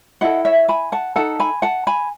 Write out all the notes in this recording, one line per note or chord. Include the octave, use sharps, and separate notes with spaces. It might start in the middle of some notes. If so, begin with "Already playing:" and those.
E4 A4 D#5 F#5
C#5 E5
G#5 B5
F#5 A5
D#4 A4 F#5 A5
G#5 B5
F#5 A5
G#5 B5